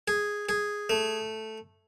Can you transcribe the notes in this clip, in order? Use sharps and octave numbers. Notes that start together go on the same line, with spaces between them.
G#4
G#4
A3